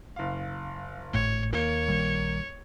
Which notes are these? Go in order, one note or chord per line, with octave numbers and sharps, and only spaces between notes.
F#1 F5
G#1 A2 A3 C#5
D#2 A#3 C#5
A#1 D#3 G3